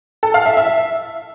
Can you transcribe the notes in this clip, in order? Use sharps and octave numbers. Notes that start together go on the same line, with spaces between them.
A4
F5
E5
E5